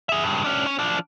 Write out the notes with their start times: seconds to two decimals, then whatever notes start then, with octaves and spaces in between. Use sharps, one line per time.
0.09 G#4 E5
0.24 G2 C#3
0.44 C#4 D4
0.67 C#4
0.79 F3 D4